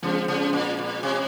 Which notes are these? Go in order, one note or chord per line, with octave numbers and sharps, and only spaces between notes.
C#3 F3 G#3 C4
C#3
A#2
A#2
C3